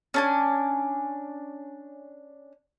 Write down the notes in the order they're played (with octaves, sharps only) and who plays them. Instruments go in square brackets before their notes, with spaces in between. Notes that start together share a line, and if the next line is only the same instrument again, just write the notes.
[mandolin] C#4 D4 G#5